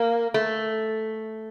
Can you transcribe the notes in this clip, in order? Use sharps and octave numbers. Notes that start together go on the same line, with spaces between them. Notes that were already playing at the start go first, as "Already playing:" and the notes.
Already playing: A#3
A3